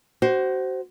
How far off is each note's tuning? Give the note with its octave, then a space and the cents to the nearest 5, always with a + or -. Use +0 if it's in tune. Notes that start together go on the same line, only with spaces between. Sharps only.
F#4 +30 C5 +0